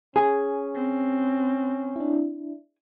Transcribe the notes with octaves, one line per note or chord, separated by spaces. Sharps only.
C#4 G#4
C4
D4 E4